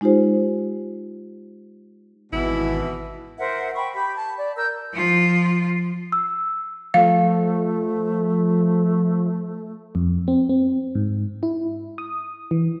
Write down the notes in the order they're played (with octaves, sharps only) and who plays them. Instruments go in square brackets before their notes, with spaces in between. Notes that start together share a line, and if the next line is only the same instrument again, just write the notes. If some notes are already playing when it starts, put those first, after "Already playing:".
[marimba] G#3 D#4 F4 G4 C5
[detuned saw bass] G#1 [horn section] B2 E3 [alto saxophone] E4
[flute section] A#4 C5 E5 F#5
G5 B5 C#6
G4 B5
A5
D5
A#4 E6 G6
[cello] F3 F4
[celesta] E6
[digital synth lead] F3 [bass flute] A3 [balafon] F5
[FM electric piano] F2
C4
C4
G#2
E4
D#6
E3